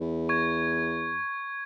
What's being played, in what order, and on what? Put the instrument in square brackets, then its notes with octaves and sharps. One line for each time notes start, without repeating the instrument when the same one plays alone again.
[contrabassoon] E2
[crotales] C#6 G#6